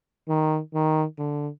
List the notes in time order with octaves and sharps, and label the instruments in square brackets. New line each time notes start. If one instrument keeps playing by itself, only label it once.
[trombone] D#3
D#3
D3